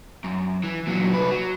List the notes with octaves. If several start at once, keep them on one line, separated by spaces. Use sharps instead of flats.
F#2
E3
A#2 F#3
C2 B4
F#3